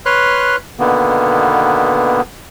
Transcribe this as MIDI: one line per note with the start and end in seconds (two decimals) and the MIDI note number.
0.06 0.56 71
0.06 0.56 73
0.06 0.56 84
0.06 0.56 89
0.06 0.56 90
0.79 2.21 47
0.79 2.21 50
0.79 2.21 51
0.79 2.21 58
0.79 2.21 59